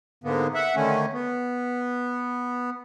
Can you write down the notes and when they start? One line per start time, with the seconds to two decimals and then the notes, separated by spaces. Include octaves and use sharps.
0.24 G#2 D3 A#3 B3
0.54 E5 F#5
0.75 D3 D#3 A3 C#4
1.13 B3